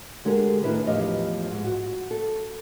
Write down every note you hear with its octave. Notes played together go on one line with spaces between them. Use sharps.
D3 G#3 D4 G4 A4 A#4
A2 D#3 D4 E4 B4
E2 A2 F3 F4 G4 D#5
G#2
F#4
A4